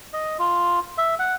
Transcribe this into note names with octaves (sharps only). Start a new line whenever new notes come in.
D#5
F4
E5
F#5